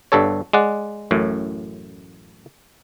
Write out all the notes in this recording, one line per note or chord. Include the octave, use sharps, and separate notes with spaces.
G1 G2 G3 A4 C#5
G#3 D5 F#5
A1 F#2 A2